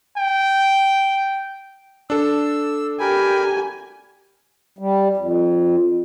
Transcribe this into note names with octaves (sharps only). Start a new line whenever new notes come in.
G5
D4 A4 E6
G4 A#4 G5 G#5 B5
G3
F2